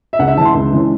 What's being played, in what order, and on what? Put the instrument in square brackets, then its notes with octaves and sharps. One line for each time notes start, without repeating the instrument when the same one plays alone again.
[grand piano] E5
C#2 F#5
E5
C#3 E3 G#3 A5
C6
C#2
C#3 E3 G#3